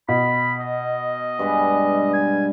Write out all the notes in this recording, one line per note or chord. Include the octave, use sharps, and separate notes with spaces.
B2 B5
D#5
G2 G#3 B4
G#5